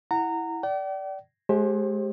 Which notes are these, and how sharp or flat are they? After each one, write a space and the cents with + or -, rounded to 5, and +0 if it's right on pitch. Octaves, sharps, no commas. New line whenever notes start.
E4 +0 F#5 +0 A#5 -20
D5 -10 G5 -45
G#3 +30 G4 +0 C5 +35